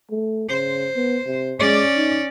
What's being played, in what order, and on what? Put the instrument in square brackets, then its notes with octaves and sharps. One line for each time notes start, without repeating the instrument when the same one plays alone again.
[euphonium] A3
[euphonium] C#3 [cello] C5
[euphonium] B3
C3
[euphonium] G#3 [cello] C#4 D5
[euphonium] D#4